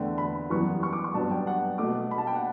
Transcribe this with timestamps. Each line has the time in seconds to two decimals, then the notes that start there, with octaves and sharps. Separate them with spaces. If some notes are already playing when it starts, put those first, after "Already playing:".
Already playing: E2 D3 A3 G5
0.18 B5
0.50 F#2 E3 G3 B3 C#6
0.83 C#6
0.93 D6
1.04 C#6
1.14 G2 F#3 B3 A5
1.31 G5
1.47 F#5
1.78 B2 A3 D6
2.11 B5
2.18 A5
2.27 G5
2.35 F#5